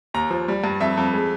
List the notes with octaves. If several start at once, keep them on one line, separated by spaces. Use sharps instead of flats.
D#2 A#5
F3
G3
G2
F2 E5
F2
G#3